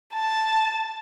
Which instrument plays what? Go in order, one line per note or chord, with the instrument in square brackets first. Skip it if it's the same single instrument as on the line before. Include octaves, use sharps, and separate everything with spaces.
[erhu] A5